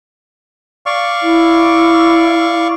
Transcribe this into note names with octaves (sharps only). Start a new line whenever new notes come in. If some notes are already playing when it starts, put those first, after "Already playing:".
D5 F5 C#6
E4